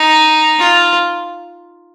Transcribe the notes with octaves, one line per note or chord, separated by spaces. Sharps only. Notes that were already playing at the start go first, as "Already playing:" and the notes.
Already playing: D#4
F4